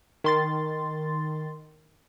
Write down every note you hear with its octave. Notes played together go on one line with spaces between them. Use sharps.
D#3 C6 A6